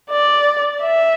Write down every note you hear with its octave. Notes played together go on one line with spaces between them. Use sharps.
D5
E5